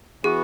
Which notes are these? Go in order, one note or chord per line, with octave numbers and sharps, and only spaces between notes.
E3 B3 F#4 G#4